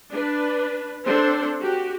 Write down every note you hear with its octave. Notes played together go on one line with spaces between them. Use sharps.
D4 B4
C4 D4 A4 C5
F#4 G4